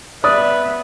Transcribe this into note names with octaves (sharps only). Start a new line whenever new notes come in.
B3 B4 D5 E5 D#6